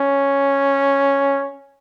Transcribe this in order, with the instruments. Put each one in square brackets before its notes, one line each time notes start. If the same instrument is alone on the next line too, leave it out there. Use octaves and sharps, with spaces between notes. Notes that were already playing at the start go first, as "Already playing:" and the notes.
Already playing: [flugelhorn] C#4